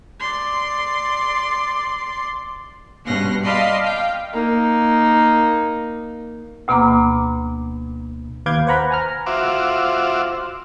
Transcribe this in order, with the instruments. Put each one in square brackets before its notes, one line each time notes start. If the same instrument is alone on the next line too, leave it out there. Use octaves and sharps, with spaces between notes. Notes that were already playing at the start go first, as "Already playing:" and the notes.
[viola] D5 C6
[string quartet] G2 B2 C#4 C6 F#6 A#6
D5 D#5 F5 A5 B5 C6
F5 G5
[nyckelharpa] A#3 D#4
[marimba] D2 B2 A#3 B3 A#5 D6
[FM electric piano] D#2 B4 F5 D6 G6 G#6
B4 C5 F#5 A#5 B5
G#5 A#5 F6
[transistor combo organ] F4 F#4 C5 E5 D6